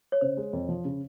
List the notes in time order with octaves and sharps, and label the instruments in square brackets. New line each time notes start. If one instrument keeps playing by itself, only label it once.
[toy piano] C#5
[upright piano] C#3 [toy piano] C5
[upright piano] G#3
F2
F3
C#3